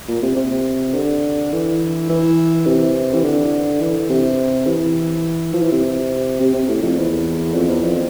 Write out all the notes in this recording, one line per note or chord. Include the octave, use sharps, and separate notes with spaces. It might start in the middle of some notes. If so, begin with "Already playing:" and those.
A#2
C3
C3
D3
E3
E3
C3
E3
D3
E3
C3
E3
F3
E3
C3
C3
C3
A2
F2
E2
F2
E2
F2